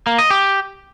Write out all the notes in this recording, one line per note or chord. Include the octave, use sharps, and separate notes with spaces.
A#3
D#5
G4